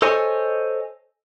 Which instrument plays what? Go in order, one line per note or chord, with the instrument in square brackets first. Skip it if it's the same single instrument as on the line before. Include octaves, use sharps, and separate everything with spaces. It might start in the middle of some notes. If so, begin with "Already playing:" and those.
[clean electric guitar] A4 C5 C#5 D#5 G#5